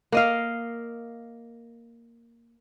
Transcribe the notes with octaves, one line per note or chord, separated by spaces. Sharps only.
A#3 D#5 F5